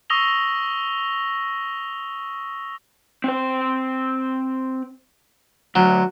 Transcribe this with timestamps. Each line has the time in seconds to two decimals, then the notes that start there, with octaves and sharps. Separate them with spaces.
0.10 C#6 D#6 E6 A#6 F7 G7
3.24 C4 C5
5.75 D2 F#3